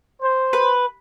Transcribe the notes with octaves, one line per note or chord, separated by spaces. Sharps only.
C5
B4